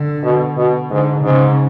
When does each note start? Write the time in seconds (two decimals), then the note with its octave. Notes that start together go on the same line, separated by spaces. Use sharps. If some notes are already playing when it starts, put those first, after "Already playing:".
Already playing: D3
0.24 B2
0.57 B2
0.90 G#2 D3
1.24 G#2 C#3